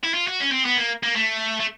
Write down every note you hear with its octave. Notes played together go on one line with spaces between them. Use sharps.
E4
F4
F#4
C#4
C4
B3
A#3
A#3
A3
A3